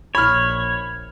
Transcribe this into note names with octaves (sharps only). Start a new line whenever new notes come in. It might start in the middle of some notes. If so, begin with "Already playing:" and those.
A#1 C#5 B5 F6